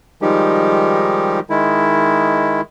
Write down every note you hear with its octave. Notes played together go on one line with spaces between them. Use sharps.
D#3 F3 G3 G#3 D#4 G4
D#3 G#3 E4